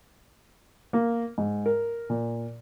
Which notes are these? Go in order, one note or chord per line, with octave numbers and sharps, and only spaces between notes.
A#3
G#2
A#4
A#2